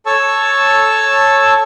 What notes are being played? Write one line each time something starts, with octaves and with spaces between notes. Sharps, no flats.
A4 C#5 A5 C#6 E6